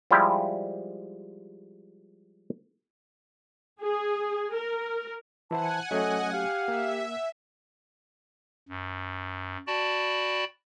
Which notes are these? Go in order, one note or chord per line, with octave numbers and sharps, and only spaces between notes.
F3 G3 G#3 E4 G4
G#4
A#4
E3 E4 C5 F#5 G#5 A5
F#3 A3 C#4 A4 D#5
G4 F5
A#3 E5
F#2
F#4 D5 G5 A5 B5